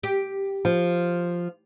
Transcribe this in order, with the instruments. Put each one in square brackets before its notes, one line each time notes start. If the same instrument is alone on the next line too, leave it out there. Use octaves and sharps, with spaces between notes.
[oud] G4
[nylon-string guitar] F3